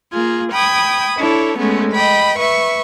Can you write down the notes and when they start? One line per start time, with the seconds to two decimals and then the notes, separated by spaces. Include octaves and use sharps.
0.12 A#3 F4 G#4
0.51 G5 B5 D#6 G#6
1.17 D4 E4 A4 C#5
1.57 G#3 A3 B3 C#4
1.92 D#5 G5 B5
2.37 B4 E5 C#6